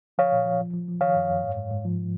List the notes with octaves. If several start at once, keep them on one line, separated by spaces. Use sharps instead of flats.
F3 C#5 F5
A#2
F3
F3
F3
F3
D#3 C#5 F5
F#2
F#2
G#2
G#2
G#2
F3